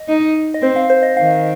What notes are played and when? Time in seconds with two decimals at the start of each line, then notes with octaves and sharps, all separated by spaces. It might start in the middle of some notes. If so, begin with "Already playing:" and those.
Already playing: D#5
0.08 D#4
0.54 D#5
0.62 C4 C5
0.76 F5
0.90 C5
1.03 D#5
1.17 D#3 F5